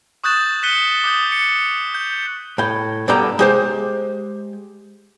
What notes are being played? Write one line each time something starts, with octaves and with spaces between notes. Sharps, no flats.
C#6 D#6 F#6 G6 A6 E7
F#6 B6 C#7 D#7 G7
D6 D#6 G6
C#7
G6
A2 G5
G2 B2 D3 D5 G5 A#5
G#3 G4 C5